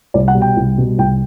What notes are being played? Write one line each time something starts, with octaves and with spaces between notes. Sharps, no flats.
C2 D5
F#5
B2 G3
G5
C2
B2 G3
C2 G5